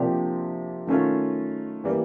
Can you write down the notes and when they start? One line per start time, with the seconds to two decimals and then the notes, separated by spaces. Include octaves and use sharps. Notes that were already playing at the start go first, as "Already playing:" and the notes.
Already playing: C3 F3 A#3 D4 G4
0.87 D#3 F#3 A3 C#4 F4
1.84 E3 G3 A#3